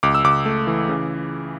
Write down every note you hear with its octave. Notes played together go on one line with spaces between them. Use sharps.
C#2 D6
E6
C#2 D6
A3
E3
C#3